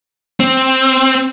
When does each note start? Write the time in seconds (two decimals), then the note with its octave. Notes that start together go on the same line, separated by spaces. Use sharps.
0.40 C4